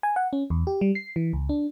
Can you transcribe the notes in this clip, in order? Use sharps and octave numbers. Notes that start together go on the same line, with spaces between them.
G#5
F#5
C#4
E2
G4
G3
C7
E3
C#2
D4